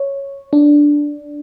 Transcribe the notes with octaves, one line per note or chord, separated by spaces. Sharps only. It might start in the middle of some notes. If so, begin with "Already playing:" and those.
Already playing: C#5
D4